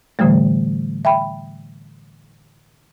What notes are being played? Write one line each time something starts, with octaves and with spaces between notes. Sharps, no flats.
A2 D3 E3 G3 A3
E5 G5 B5